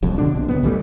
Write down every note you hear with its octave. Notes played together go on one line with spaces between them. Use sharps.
D#1 C2 F2
B2 D3 D4
A#1
C#2 G2 B3
D#3 E3 G3 A3